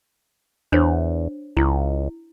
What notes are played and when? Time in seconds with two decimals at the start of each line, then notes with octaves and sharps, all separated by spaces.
0.72 E2 D4 C5 C#5
1.57 C#2 E4